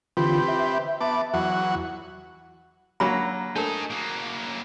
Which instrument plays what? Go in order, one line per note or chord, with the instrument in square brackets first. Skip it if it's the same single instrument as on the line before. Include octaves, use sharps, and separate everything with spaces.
[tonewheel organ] D3 E3 F4 [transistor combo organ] C4 G4 B4
[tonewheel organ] E5
[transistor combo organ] B3 A5 D6
E2 F#3 F#4
[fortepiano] F#3 A#3 [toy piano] D4 B5
[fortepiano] A3 [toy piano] D4 A#4 [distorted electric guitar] D#4 G#4
[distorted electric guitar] F#3 A#3